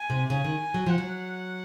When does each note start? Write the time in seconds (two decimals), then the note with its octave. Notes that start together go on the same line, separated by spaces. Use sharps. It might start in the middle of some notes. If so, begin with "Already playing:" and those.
Already playing: G#5
0.10 C3
0.30 C#3 G#5
0.44 D#3
0.74 F#3
0.86 F3 F#5
0.98 F#3